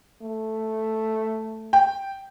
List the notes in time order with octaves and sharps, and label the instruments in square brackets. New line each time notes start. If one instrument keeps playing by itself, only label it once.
[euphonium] A3
[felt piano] G5